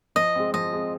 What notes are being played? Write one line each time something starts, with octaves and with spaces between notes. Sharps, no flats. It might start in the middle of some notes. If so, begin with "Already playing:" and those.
F3 D#5
G#3 C4
F3 D#5
G#3 C4